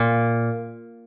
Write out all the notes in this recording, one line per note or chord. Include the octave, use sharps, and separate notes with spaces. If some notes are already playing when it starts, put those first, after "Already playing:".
Already playing: A#2